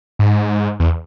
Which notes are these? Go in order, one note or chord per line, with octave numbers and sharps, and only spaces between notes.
G#2
E2